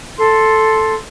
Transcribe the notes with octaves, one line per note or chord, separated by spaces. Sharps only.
A4 C6